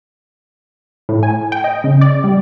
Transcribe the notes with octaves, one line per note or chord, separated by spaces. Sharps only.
A2
G#5
G5
D#5
C#3
D5
G3